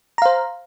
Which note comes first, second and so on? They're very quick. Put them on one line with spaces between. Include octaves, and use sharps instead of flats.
A#5 F5 C5